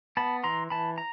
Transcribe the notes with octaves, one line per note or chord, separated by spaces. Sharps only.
B3 A5 B5
E3 A#5 C6
E3 A5 B5
A#5